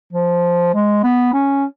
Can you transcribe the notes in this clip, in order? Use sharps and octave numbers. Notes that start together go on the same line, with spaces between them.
F3
G#3
B3
C#4